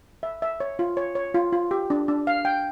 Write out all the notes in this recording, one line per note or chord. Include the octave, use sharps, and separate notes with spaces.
E5
E5
C#5
F4
C#5
C#5
F4
F4
G4
D4
D4
F5
G5